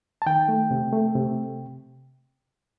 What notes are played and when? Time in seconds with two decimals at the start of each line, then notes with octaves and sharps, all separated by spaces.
0.22 A5
0.26 D#3 G5
0.48 A3
0.71 C3
0.93 A3
1.15 C3